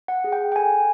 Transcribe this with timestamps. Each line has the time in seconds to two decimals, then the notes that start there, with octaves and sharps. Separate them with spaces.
0.08 F#5
0.24 G#4
0.32 G5
0.52 G5
0.56 A4 G#5